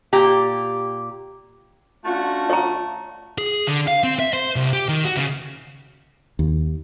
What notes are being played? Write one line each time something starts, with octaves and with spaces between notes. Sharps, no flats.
A#2 G4 A#5
A3 C#4 D4 F4 F#4
C#5 A#5
G#4
D3
F5
C4
E5
C5
C2
G4
D#3
F#4
C#3
D#2